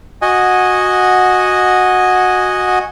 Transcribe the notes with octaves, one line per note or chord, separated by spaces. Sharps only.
F#4 D#5 F#5 G#5